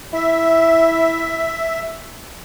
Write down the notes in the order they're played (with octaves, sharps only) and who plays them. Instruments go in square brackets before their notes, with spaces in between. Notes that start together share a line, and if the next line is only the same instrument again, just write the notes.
[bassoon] E4 [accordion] E5